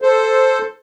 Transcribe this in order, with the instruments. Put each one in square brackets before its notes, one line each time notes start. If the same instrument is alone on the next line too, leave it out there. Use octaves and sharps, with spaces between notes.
[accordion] A4 C5